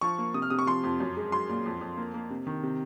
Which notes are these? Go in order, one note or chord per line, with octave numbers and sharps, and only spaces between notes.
F3 C#6
A#3
C3 D#6
F6
C3 D#6
C#6
F3 C6
F2
F#2
G#3
F#3 C6
A#2
F2
F2
A#3
A#3
C3
D#3
C3